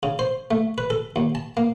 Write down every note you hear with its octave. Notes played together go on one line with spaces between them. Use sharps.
C#3
C5
A3
B4
A4
D#2
A5
A#3